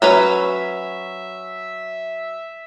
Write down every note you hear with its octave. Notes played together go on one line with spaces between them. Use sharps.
F#3 C#4 B4 E5